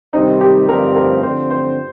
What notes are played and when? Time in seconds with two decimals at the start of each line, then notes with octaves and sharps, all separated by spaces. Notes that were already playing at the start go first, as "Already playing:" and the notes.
0.13 C3 D#3 G3 C4 D#4
0.41 G4
0.68 G2 D3 F3 C4 A#4
0.96 A#4
1.23 D3 F3 C4 C5
1.50 C5